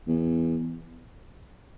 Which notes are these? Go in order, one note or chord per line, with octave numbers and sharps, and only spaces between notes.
E2